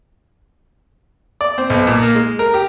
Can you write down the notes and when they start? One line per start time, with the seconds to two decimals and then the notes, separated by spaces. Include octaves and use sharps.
1.41 D5
1.58 C4
1.70 B1
1.87 A#2
2.02 A#3
2.15 G#3
2.39 A#4
2.54 G4